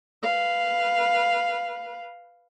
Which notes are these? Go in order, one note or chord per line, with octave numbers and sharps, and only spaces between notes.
B4 F5